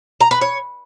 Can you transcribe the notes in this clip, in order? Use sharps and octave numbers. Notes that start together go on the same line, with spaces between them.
A#5
B4
C#5